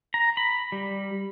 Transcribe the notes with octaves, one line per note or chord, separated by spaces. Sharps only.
A#5
B5
G3